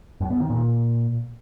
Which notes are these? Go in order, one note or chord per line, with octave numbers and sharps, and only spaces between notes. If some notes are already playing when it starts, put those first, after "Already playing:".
F#2
B3
D#3
A#2